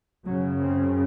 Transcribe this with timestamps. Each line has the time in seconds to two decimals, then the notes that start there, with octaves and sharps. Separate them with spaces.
0.25 F#2 C#3 F#3
0.62 C4